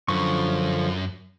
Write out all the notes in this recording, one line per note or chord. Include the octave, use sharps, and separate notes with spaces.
F#2 D3 F3 C#6